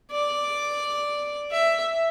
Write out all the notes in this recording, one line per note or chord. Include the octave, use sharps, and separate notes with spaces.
D5
E5